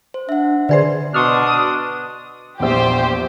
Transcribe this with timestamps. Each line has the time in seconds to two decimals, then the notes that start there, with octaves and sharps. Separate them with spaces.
0.14 C5
0.29 D4 E5 F#5
0.69 D3 G#4 B4 C5 D5
1.14 B2 D4 C6 C#6 D#6 F6
2.60 A#1 E2 G4 C5